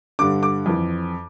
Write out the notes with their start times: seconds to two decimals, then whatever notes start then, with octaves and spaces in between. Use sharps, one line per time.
0.19 G2 D3 D6
0.43 D6
0.66 F2 E3